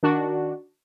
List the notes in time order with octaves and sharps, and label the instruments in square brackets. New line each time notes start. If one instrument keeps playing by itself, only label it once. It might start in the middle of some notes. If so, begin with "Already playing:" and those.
[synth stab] D#3 D4 F#4